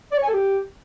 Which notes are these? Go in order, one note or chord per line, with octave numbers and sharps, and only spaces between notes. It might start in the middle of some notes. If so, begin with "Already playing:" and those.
D5
C#5
G#5
A4
G4